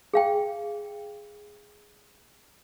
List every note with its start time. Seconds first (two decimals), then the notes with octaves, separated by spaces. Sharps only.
0.14 G#4 F5 G5